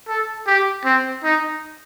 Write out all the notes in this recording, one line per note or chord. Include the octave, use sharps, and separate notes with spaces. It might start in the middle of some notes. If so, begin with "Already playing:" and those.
A4
G4
C4
D#4